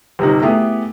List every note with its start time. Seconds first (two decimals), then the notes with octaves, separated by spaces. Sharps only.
0.19 G1 C3 D#4
0.42 A3 B3 E4 G4 G#4